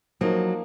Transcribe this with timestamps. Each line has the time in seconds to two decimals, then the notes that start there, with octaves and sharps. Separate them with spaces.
0.21 F3 F#3 A#3 D#4 A#4